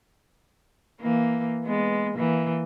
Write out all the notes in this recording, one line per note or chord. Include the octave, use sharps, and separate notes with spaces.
E3 A#3
G#3 B3
E3 A#3